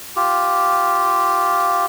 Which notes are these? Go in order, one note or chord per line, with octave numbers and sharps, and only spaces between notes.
F4 G4